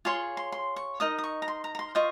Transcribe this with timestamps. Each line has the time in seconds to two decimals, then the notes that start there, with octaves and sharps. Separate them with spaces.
0.05 F4 G#4 C#5 C6
0.37 C6
0.52 C6
0.76 C#6
1.00 D#4 A#4 D#5 D#6
1.18 D#6
1.24 C#6
1.42 A#5
1.48 C6
1.64 A#5
1.75 A#5
1.79 C6
1.95 F4 C5 D#5 C#6